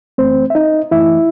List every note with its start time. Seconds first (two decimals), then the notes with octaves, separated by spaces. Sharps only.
0.18 F#2 E3 A3 C4 C5
0.50 E5
0.55 D#4 D#5
0.91 F#2 E3 A3 E4 E5